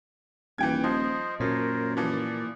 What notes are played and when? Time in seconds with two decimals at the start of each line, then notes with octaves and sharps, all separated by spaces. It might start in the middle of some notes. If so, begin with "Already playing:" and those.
0.58 D#1 E3 G5 G#6
0.84 F3 C5 D#5
1.40 F#2 A#2 A#4 C5 C#5
1.97 E3 F3 D5